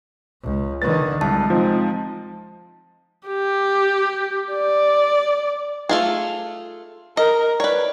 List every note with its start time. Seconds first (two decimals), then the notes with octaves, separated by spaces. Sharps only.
0.42 C#2
0.82 D3 D#3 B4 A6
1.21 C2 G#3 A5
1.50 F3 C4 D#4
3.28 G4
4.52 D5
5.89 A3 F4 G#4
7.17 A#4 D#5
7.60 B4 C#5 D5